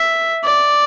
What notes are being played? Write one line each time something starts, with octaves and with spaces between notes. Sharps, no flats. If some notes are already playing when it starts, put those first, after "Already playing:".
Already playing: E5
D5